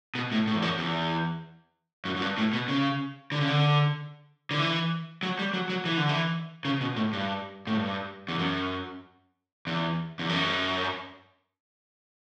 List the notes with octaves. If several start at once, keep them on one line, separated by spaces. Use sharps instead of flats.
B2
A2
A2
E2
F#2
E2
F#2
F#2
G2
A2
B2
C#3
D3
C#3
D3
D3
E3
F#3
G3
F#3
F#3
E3
D3
E3
C#3
B2
A2
G2
A2
G2
E2
F#2
E2
E2
F#2